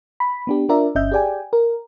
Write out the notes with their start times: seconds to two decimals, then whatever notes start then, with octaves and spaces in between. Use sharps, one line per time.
0.20 B5
0.47 B3 D4 G4
0.69 D4 F4 A#4 D5 E5
0.95 G1 C#4 D#5 E5 G6
1.12 G4 G#4 D5 G5 G#5
1.53 A#4